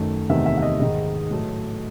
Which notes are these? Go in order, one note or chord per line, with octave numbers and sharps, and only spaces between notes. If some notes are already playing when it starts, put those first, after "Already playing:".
Already playing: F#2 D#3 A3
E2 C3 D#3 A3 E5
E5
E5
D#5
G#2 D#3 G#3 D#5
A2 F#3 A3